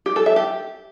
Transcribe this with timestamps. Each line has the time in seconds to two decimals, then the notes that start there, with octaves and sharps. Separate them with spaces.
0.06 G4
0.16 A4
0.26 E5
0.36 G4